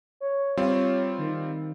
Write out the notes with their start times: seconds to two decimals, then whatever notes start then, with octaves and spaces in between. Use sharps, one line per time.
0.21 C#5
0.57 G3 C4 F4 C#5
1.18 D#3